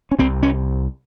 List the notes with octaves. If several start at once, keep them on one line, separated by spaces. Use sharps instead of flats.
C#4
C2 C3 C4
C#4